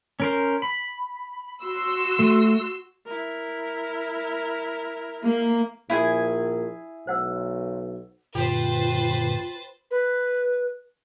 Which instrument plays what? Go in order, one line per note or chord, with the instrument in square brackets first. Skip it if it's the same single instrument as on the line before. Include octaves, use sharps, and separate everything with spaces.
[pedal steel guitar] C#4 A#4 C5
B5
[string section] F#4 C6 E6
[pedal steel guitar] A3
[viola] E4 A#4
[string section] A#3
[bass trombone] A#1 [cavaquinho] E4 G#4 G#5
[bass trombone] B1 [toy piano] C5 F#5 E6
[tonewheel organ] F#2 A#2 D3 [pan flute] F4 [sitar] G4 [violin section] B4 C5 A6
[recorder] B4